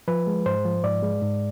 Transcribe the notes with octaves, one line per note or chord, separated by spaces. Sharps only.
F3 B4
G#3
G#2 C5
F3
G#2 D5
G#3
G#2